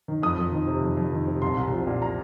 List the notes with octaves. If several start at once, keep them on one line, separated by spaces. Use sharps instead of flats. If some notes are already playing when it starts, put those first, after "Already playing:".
D#3
F2 D#6
F2
D#3
C3
F2
F2
D#3
C3
C2 C6
C2
F3
A#2
A#5